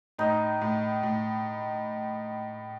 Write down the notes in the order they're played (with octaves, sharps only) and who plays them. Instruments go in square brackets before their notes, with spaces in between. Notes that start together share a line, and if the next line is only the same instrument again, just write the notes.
[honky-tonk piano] A2 [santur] D#4
[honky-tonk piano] A2
A2